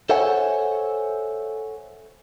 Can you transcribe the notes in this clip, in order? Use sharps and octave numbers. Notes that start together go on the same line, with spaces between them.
A4 C5 C#5 E5 F#5 G#5